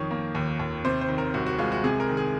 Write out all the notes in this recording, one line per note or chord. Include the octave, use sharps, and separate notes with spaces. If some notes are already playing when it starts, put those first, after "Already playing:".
Already playing: F2 D#3 C#5
A#3
D#2
D#2
C3 C5
C5
D#3
A#4
C2 F#4
F#4
G#3 F4
F#4
C3 G#4
A#4
D#3
G#4